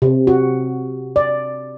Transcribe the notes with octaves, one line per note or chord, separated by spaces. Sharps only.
C3
F#4
D5